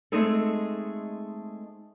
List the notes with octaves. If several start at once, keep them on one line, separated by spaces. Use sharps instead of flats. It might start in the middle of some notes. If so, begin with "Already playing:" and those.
G#3 A3 C4 D#4 G#4 A4